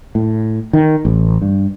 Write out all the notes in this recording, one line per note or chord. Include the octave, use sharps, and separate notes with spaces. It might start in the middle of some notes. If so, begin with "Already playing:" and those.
A2
D#3
A1
G2